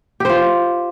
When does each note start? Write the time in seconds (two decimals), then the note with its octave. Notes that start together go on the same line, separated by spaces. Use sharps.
0.20 G4
0.25 C5
0.29 F4